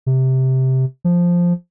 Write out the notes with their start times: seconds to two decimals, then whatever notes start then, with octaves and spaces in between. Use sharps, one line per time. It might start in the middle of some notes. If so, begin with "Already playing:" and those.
0.06 C3
1.04 F3